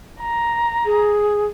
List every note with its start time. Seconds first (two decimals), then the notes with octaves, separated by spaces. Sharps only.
0.20 A#5
0.86 G#4